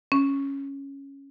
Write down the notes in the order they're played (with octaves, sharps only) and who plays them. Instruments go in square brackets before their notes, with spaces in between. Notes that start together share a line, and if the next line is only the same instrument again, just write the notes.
[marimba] C#4